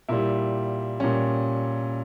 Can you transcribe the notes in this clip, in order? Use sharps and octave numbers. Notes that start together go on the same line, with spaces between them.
A#2 G3 E4
A#2 G3 C#4